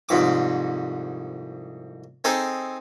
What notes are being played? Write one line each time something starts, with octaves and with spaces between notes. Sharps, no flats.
C2 F2 G#2 D6
C4 D#4 G#4 A4